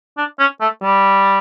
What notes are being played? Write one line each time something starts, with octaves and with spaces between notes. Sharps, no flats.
D4
C#4
A3
G3